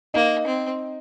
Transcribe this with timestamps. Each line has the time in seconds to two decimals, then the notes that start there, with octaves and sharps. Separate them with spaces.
0.14 A#3 D#4
0.46 C4